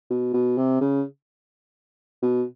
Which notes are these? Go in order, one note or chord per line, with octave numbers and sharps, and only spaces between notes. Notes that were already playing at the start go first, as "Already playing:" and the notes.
B2
B2
C3
C#3
B2